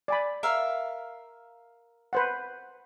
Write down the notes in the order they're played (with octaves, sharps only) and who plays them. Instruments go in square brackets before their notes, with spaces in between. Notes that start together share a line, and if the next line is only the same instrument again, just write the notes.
[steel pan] D5 G#5 B5
[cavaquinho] A#4 E5 F5
[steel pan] B4 C5 F#5